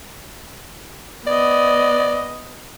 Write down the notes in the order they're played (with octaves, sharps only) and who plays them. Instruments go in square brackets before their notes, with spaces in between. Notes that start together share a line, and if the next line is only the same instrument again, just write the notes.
[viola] B3 D#5 [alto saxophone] D5